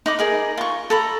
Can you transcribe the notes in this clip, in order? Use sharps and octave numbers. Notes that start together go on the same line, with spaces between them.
D#4 B5 D6
D#4 G#4 A#4
F4 C#6
A4 A#5 B5